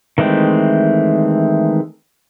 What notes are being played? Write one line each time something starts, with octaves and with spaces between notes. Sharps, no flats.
D#3 E3 G#3 A3 C4